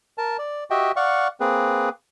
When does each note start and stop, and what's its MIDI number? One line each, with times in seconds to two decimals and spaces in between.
0.18 0.37 70
0.18 0.37 81
0.39 0.64 74
0.70 0.92 66
0.70 0.92 67
0.70 0.92 75
0.70 0.92 76
0.70 0.92 79
0.96 1.28 74
0.96 1.28 77
0.96 1.28 78
0.96 1.28 85
1.40 1.89 58
1.40 1.89 60
1.40 1.89 68
1.40 1.89 71